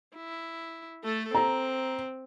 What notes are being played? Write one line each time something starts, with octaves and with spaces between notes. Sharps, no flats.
E4
A3 A4
C4 A#5